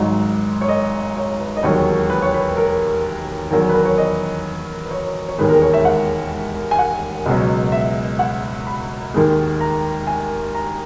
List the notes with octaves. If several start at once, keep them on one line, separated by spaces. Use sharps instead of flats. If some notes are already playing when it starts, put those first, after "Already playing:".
Already playing: G#1 G#2 F#3 D#5
C#5
D#5
C#5
B4
D#5
E1 D#2 D#3 F#3 C#5
B4
C#5
B4
A#4
E2 D#3 F#3 A#4
B4
A#4
C#5
D#5
B4
C#5
C#5
E1 D#2 D#3 G#3 B4
A#4
C#5
E5
F#5
G#5
F#5
C#2 B2 F#3
E5
F#5
B5
D#2 D#3 G#3
A#5
G#5
A#5